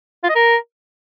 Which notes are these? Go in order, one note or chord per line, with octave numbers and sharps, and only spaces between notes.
F4
D#5
A#4